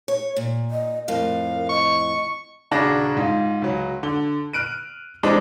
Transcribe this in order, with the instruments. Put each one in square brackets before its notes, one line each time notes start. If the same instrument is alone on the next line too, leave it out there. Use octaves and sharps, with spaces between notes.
[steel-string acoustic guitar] C#5
A#2
[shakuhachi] D#5
[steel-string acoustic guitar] F2 A2 [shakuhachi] A#4 [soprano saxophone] F5
[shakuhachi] D#5 [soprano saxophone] C#6
[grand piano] D#1 C#3 D4 F#4 G#4 A#6
G#2 F4
C#2 F#3
D3 G7
F6 F#6 D7 D#7
E3 G3 G#3 C4 D4 D#4